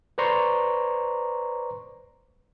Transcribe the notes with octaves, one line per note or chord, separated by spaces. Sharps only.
B4 C5 D5 A#5 C6 C#6